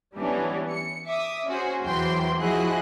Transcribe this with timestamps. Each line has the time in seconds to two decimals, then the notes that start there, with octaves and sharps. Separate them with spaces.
0.17 E3 G3 B3 C#4 D4
0.70 C#7
1.08 E5 D6 D#6
1.48 C#4 F#4 G#4 C5
1.85 E2 E3 F#3 C5 G5 C6
2.37 F3 E4 F#4 G#4 D#5 F#6